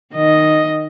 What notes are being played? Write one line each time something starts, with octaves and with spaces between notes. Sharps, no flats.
D#3 D#5